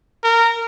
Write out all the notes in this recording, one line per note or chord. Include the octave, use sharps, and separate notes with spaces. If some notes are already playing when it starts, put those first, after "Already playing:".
A#4